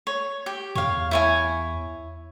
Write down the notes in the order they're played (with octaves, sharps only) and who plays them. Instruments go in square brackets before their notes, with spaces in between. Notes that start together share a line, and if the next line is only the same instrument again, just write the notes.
[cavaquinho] C#5
G4
[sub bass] E2 [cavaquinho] C#5 F5
[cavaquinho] E4 C#5 G#5